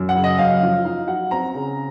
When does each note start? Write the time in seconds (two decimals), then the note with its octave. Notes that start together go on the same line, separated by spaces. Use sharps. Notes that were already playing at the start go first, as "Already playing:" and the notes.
Already playing: F#2
0.09 F#5
0.16 C#3
0.24 D#5
0.38 F#2 F5
0.63 F3
0.85 D#4 F5
1.08 F#3 F#5
1.31 C4 A#5
1.54 C#3